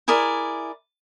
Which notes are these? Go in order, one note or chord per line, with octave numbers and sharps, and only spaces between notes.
E4 G#4 A#4 D5